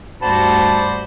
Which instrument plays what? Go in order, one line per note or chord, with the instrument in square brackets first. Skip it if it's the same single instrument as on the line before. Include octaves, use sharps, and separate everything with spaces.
[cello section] D2 G2 F#4 [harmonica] C5 D5 B5 [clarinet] A5